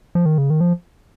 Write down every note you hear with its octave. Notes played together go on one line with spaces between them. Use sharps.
F3
D#3
C#3
D#3
F3